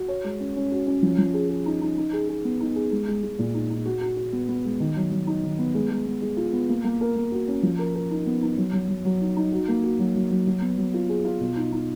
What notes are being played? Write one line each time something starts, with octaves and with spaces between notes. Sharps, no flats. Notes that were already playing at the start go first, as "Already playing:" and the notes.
Already playing: F#4
C#5
G#3
C#4
C#4
F#4
C#4
F3
F3
G#4
G#4
D#4
D#4
D#4
G#4
G#4
B3
D#4
G#4
G#3
G#3
G#3
A#2
D#4
D#4
F#4
F#4
F#4
B3
B3
G#3
D#3
F#3
F#3
D#4
D#3
B3
G#3
G#3
B3
G#3
F4
B3
A#3
A#3
A#4
A#3
F#4
C#4
F3
A#4
A#4
D#4
B3
D#4
F#3
F#3
F#3
F#3
D#4
D#4
F#4
A#3
F#4
F#3
F#3
F#3
F#3
B3
F#3
F4
G#4
F4
B2
D#4
D#4